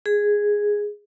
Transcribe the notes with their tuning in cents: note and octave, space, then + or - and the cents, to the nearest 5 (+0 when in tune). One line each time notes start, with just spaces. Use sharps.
G#4 -5